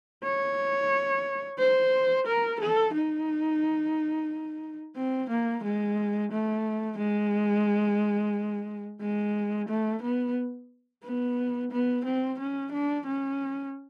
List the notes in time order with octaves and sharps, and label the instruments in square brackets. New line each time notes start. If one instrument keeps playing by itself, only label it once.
[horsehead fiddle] C#5
C5
A#4
A4
D#4
C4
A#3
G#3
A3
G#3
G#3
A3
B3
B3
B3
C4
C#4
D4
C#4